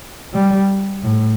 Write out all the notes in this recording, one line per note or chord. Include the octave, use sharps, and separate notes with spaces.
G3
A2